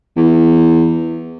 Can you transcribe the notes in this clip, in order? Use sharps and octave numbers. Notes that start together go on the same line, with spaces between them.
E2